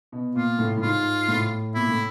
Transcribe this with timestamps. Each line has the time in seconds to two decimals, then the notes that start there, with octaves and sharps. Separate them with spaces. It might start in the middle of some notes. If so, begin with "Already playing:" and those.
0.12 B2
0.35 A#2 F4
0.59 A2
0.77 A2
0.82 G#2 F4
1.28 A2
1.75 A#2 E4
1.89 A2